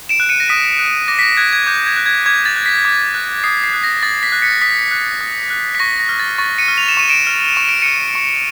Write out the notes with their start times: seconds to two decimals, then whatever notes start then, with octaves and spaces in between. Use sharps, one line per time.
0.09 D7 E7
0.20 F#6
0.29 C#7 D#7
0.40 A#6
0.49 D#6 B6
0.79 F#6
1.08 D6 A#6
1.19 B6
1.23 A#6
1.37 F#6 G#6
1.52 G#6
1.67 D6 G6
1.87 G#6
1.97 F#6
2.06 G#6
2.26 D6 G#6
2.46 A6
2.56 F#6
2.66 B6
2.85 D6
3.14 F#6
3.44 D#6 C7
3.64 C7
3.73 F#6
3.84 A#6
4.03 D#6 A6
4.23 B6
4.32 F#6
4.42 B6 C#7
4.61 D#6 B6
4.91 F#6
5.21 D#6
5.50 F#6
5.75 B6
5.80 C#6 A#6
5.99 A#6
6.09 F6
6.20 A6
6.38 C#6 A6
6.58 C#7 D#7
6.68 F6
6.78 F7
6.89 E7
6.97 C#6 D#7
7.09 D7 E7
7.27 F6
7.56 C#6 D#7
7.69 D7
7.82 F6 C#7 D#7
8.15 C#6